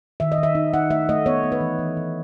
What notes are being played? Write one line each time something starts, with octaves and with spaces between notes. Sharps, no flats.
D#3 E5
D#5
D#3
E5
D#4
D#4 F#5
A3 E5
A3 D#5
B3 C#5
B3
B4
E3
E3
E3